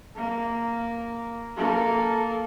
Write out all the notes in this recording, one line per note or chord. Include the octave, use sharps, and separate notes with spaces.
A#3
A#3 A4